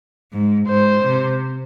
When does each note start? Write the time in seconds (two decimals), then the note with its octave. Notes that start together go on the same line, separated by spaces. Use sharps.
0.32 G#2
0.68 G#2 C5
1.04 C3